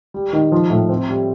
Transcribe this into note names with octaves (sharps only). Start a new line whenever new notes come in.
G3
D#3
F3
A2
C4
G3